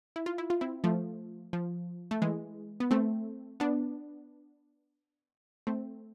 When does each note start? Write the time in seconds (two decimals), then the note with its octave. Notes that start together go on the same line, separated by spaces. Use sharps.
0.16 E4
0.26 F4
0.38 E4
0.50 F4
0.61 C4 E4
0.84 F3 A3
1.53 F3
2.11 A3
2.22 E3 G#3
2.80 B3
2.91 A3 C4
3.60 B3 D4
5.67 A3 C4